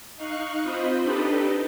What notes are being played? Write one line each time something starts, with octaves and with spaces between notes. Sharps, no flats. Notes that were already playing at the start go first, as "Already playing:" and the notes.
D#4 F5 C#6 F#6
C4 F4 C5 D#5 B5
D4 D#4 G4 A4 B4 D#5